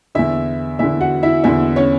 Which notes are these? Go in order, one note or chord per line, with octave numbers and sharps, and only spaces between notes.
E2 D3 E4 E5
E2 D3 E4 E5
F#4 F#5
E4 E5
E2 D3 E4 E5
C#4 C#5